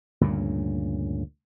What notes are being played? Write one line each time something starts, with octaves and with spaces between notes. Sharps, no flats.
D2 G2 A#2 C#3